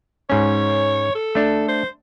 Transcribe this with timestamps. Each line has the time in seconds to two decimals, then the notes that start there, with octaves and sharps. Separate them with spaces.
0.30 G#2 C#4 C#5
1.15 A4
1.35 A3 D4
1.68 C5